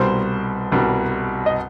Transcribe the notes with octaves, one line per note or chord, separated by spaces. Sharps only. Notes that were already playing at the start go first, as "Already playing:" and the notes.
Already playing: C2 B2 G3 C5
C2 B2 G3
D#5